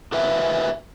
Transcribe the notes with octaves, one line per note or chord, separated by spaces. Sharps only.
F#4 A#4 B4 E5 G5 G#5